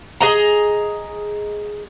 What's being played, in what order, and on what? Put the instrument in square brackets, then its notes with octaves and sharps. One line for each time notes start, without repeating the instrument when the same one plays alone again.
[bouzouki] G#4 D#5 A#5